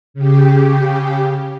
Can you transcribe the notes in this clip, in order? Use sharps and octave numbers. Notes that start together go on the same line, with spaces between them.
C#3 G4